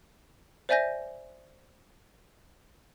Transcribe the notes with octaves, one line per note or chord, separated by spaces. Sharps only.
C5 D5 E5 G#5 G6 A#6